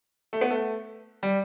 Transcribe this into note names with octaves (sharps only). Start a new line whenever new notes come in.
A3
B3
A3
G3